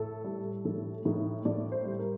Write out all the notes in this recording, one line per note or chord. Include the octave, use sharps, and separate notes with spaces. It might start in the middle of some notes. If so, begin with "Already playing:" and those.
Already playing: A2 A4
G3
A2 A4
A2 D#4
A2 D5
C5
G3
A#4